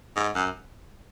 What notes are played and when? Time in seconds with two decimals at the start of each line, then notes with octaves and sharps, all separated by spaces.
0.16 G#2
0.35 F#2